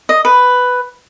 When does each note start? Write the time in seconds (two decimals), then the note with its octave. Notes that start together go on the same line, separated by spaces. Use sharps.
0.09 D#5
0.25 B4